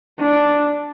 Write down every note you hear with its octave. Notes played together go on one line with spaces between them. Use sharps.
D4